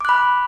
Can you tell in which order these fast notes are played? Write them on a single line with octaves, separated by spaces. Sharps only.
D6 F#6 B5